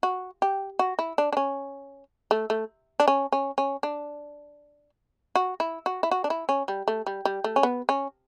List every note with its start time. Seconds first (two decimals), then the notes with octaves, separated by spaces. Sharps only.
0.03 F#4
0.42 G4
0.79 F#4
0.99 E4
1.18 D4
1.33 D4
1.37 C#4
2.31 A3
2.50 A3
3.00 D4
3.08 C#4
3.32 C#4
3.58 C#4
3.83 D4
5.35 F#4
5.60 E4
5.86 F#4
6.03 E4
6.11 F#4
6.24 D4
6.30 E4
6.49 C#4
6.68 G3
6.88 A3
7.06 G3
7.25 G3
7.44 A3
7.56 C#4
7.63 B3
7.89 C#4